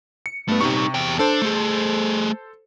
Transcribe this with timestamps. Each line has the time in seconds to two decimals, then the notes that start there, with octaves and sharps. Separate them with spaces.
0.26 C#7
0.48 G2 A3 B3
0.61 C3 G3 D#4 C#6
0.95 E2 G5
1.19 D4 A4 C5
1.42 A3 G#4